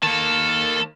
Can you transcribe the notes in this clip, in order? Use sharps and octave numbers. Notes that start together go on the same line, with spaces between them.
D#3 A#3 A4 A5